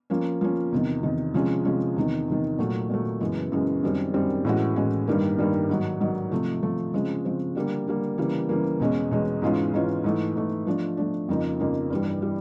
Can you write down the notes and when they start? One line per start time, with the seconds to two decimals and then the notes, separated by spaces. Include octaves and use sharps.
0.10 F3 A#3 C#4
0.41 F3 A#3 C#4
0.72 E2 C3 D#3
1.03 E2 C3 D#3
1.34 C3 F3 G#3 C#4
1.65 C3 F3 G#3 C#4
1.96 E2 C3 D#3
2.28 E2 C3 D#3
2.58 A#2 F#3 A3
2.90 A#2 F#3 A3
3.20 F#2 C#3 E3 G#3 B3
3.52 F#2 C#3 E3 G#3 B3
3.83 F#2 D#3 G3 C4
4.14 F#2 D#3 G3 C4
4.45 A2 E3 G#3 C#4 F#4
4.76 A2 E3 G#3 C#4 F#4
5.07 G2 D#3 G3 A#3
5.38 G2 D#3 G3 A#3
5.69 G#2 D#3 F#3
6.00 G#2 D#3 F#3
6.32 C3 F3 A3
6.63 C3 F3 A3
6.94 C#3 F3 G#3 C4
7.25 C#3 F3 G#3 C4
7.55 D3 G3 A#3
7.87 D3 G3 A#3
8.18 C#3 E3 G3 A#3
8.49 C#3 E3 G3 A#3
8.80 E2 B2 G#3 C#4
9.11 E2 B2 G#3 C#4
9.42 G#2 E3 G#3 C#4 F4
9.73 G#2 E3 G#3 C#4 F4
10.04 G#2 E3 A3
10.35 G#2 E3 A3
10.67 F3 A3 D4
10.97 F3 A3 D4
11.29 F2 C#3 F3 A#3 D#4
11.60 F2 C#3 F3 A#3 D#4
11.90 G2 E3 G3
12.22 E3 G3